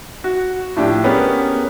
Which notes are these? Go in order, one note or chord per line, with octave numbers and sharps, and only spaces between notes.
F#4
A2 F3 D4 G4
B3 C#4 G4 G#4 A#4 B4